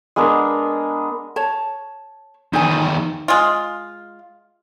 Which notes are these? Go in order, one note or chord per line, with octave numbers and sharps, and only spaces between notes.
G#3 B3 D4 A#4
C#5 A5
E2 D#3 D#4 G#5
G#3 F4